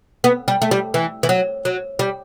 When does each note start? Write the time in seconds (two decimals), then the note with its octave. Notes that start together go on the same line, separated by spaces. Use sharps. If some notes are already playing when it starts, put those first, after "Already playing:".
0.24 B3
0.48 G3
0.62 A3
0.71 G3
0.94 E3
1.23 E3
1.29 F#3
1.65 F#3
1.99 G3